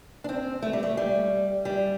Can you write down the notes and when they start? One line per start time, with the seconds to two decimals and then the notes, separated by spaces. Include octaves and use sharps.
0.24 D4
0.29 C4
0.62 A3
0.73 G3
0.83 A3
0.97 G3
1.65 G3